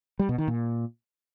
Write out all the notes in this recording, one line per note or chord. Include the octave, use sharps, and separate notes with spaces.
G3
B2
D#3
A#2